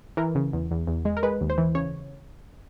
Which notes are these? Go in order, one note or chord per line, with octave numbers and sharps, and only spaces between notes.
E3 A#4
C#3
E2
E2
E2
G#3
A#4
G#3 B4
D#2
C5
E3
C#3 C#5